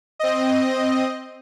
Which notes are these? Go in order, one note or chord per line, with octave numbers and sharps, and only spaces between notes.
C4 D#5